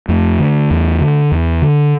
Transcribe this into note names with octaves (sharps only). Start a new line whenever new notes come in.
F2 A3
D3
E2
D3
E2
D3